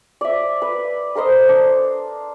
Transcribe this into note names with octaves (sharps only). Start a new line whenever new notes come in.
D5 E5
B4
A4 A#4 C5 D#5
D4